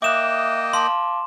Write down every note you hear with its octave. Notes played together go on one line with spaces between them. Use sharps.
A#3 D#5 E5 G5 D6 D#6 F#6 E7
F5 A5 C6 D6